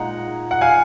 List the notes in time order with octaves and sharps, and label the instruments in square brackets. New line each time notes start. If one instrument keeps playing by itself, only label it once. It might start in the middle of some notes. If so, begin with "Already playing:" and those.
Already playing: [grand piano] A#2 G#3 D#4 F#5 A#5
F#5
F5 G#5